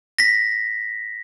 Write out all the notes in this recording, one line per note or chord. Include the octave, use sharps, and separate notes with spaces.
A#6 B6